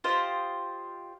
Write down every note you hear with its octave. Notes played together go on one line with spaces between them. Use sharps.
F4 G4 C5 D#5